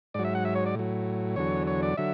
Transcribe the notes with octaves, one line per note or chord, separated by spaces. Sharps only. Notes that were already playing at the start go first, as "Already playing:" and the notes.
G#2 F#3 D5
E5
F#5
E5
C#5
D5
A2 F#3
E2 D3 F#3 C#5
C#5
D5
D3 F#3 E5